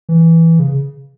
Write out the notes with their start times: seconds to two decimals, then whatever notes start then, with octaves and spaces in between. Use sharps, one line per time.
0.09 E3
0.59 C#3